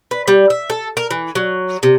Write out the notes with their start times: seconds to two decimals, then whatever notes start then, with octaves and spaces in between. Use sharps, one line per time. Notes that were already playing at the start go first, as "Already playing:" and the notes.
0.11 B4
0.28 G3
0.50 E5
0.70 A4
0.97 A#4
1.11 E3
1.35 F#3
1.83 C3